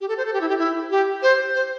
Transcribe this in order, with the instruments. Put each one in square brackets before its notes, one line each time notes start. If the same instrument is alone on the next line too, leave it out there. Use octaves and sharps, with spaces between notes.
[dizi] G4
A4
C5
A4
G4
E4
G4
E4
G4
C5
C5